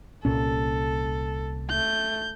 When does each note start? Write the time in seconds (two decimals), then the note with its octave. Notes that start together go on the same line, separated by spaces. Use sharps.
0.25 C2 A#2 C#4 A4
1.70 A3 G6